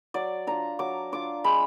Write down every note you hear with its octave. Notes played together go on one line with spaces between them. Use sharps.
F#3 D5
D4 F4 A#5
F#3 D6
D4 F4 D6
G#3 B5